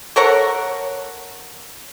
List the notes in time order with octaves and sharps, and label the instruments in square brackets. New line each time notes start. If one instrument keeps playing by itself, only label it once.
[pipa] A4 A#4 C#5 F#5